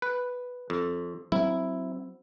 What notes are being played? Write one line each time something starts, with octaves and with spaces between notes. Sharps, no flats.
B4
F2
F#3 C4 E4